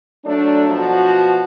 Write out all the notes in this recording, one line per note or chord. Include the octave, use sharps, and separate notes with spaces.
F#3 A3 D4
B2 F3 F#4